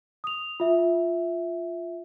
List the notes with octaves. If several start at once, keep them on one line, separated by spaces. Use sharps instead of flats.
D#6 F7
F4 E5